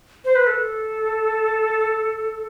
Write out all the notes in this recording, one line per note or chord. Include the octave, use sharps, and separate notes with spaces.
C5
B4
A4